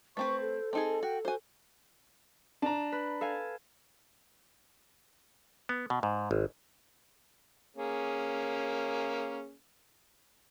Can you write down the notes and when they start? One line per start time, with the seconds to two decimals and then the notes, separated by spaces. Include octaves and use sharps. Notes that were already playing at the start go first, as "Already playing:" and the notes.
0.17 A3 C4 B4 C5 C#6
0.41 A4
0.73 C4 D#4 G#4 A5
1.03 F#4 G5
1.25 F#4 C5 G#5
2.62 D4 A5 A#5
2.92 B4
3.21 A4 F5 G#5
5.69 B3
5.90 B2
6.03 G#2
6.31 G#1
7.77 A#3 C#4 G#4